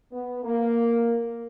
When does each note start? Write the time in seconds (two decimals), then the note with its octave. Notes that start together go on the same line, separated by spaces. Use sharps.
0.12 B3
0.44 A#3